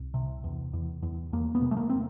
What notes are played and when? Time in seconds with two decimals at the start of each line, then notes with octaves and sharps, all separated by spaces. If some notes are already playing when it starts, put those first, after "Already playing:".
Already playing: C2
0.14 C3
0.44 E2
0.73 E2
1.03 E2
1.32 E2 A#3
1.55 B3
1.61 C3
1.71 A3
1.77 A#3
1.90 C4